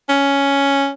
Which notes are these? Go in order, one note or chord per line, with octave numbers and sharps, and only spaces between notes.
C#4